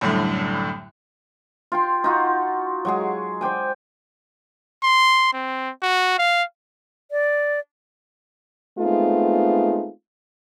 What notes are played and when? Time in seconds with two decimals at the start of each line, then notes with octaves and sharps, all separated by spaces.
0.01 C2 F#2 A2 D3
1.72 F4 G5 C6
2.04 D#4 F4 F#4
2.85 F#3 G#3 G#4
3.41 C5 D5 G5 G#5
4.83 C6
5.33 C4
5.82 F#4
6.19 F5
7.11 D5
8.79 G#3 A3 B3 C4 D#4 F4